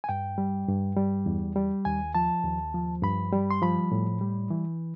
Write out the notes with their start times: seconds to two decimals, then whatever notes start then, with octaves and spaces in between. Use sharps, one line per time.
0.04 G#5
0.09 G2 G5
0.38 G3
0.68 G2
0.97 G3
1.26 E2
1.56 G3
1.85 D#2 G#5
2.15 F3 A5
2.44 D#2
2.74 F3
3.03 G2 B5
3.33 G3
3.51 C6
3.62 F3 B5
3.92 A2
4.21 G3
4.50 E3